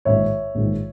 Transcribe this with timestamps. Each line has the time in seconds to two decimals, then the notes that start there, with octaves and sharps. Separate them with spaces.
0.05 A#1 G#2 D#3 C#5 E5
0.55 A#1 G#2 D#3